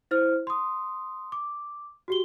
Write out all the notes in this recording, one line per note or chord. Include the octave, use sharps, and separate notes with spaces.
E4 C5 F6
C6 D#6
D6
F#4 G4 G7